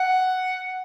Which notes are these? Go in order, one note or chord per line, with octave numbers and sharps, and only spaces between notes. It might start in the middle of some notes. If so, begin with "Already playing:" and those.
Already playing: F#5